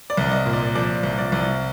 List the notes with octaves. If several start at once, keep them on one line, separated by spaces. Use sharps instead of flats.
D5
C2
D#5
A#2
D5
F3 D5
C2
D5
C2